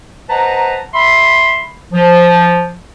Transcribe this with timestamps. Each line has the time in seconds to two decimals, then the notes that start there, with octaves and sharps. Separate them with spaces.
0.30 B4 C5 D#5 F#5 A5 A#5
0.94 E5 B5 C6
1.93 F3